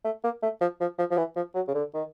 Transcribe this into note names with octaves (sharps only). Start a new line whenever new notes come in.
A3
A#3
A3
F3
F3
F3
F3
E3
F3
F#3
C#3
D3
D#3